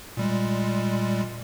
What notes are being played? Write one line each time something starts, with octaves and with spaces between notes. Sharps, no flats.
A#2 G3 G#3